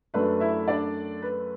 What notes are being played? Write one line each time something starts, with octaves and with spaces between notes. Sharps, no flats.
F#2 F#3 A3 D4 B4
E4 E5
D4 D5
B4